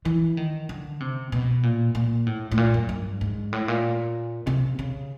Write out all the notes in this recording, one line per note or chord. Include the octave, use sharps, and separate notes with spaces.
E3
D#3
D3
C3
B2
A#2
A#2
A2
A2
A#2
F#2
G2
G#2
A2
A#2
C3
C#3